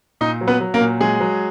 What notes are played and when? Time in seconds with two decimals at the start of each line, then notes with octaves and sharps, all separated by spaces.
0.21 A#2 D#4 D#5
0.41 F#3
0.47 B3 B4
0.61 F#3
0.74 A#3 A#4
0.81 A#2
1.00 F#3 G#3 G#4
1.21 F#3